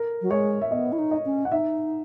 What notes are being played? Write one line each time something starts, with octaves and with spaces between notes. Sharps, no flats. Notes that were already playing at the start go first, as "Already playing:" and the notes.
Already playing: A#4
F#3
G#3 C#5
E5
B3 D#5
E4
D#4
D#5
C#4
F#5
D#4 E5